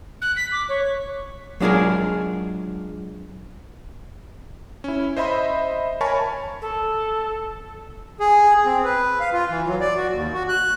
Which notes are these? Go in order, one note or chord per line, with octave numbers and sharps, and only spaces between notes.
F#6
B6
D6
C#5
F#3 G#3 D4 F4 G#4 A#4
C#4 E4
C5 D#5 E5 B5 C6
A#4 C#5 G#5 A5 B5 C#6
A4
G#4
C4
B4
F5
F4
E3
F#3
D5
F#4
D#2
F#4
F#6